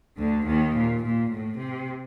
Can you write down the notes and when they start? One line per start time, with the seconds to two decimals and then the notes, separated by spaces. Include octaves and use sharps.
0.18 D2 D3
0.46 D#2 D#3
0.74 A#2
1.03 A#2
1.31 A2
1.59 C3